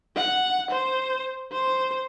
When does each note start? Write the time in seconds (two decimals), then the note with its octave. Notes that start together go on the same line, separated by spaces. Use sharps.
0.16 F#5
0.70 C5
1.52 C5